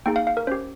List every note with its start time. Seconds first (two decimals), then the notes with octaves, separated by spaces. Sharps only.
0.06 A#3 D#4 G#4 G5
0.16 F5
0.27 F5
0.37 A#4
0.47 C#4 G4 C5